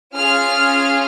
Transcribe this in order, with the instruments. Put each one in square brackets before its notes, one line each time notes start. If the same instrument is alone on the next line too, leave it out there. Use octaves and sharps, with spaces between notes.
[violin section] C#4 F4 G#4 F6